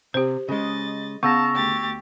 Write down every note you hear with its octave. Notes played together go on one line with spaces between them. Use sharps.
C3 G4 C5
C#3 G#3 D#5 A6
C#3 B3 F5 A5 A#5 C#6 E6 A#6
D2 G4 A6